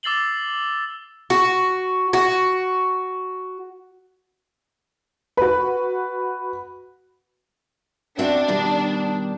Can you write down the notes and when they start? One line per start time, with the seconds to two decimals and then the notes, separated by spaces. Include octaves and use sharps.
0.03 D6 E6 A6 C7 F#7 G7
1.30 F#4
2.13 F#4
5.37 F#4 B4
8.19 C4 D4 F#4 E5
8.48 B2 D#3 G3